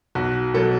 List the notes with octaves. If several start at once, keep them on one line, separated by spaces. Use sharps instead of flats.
B1 F#4
B2 F#3 A4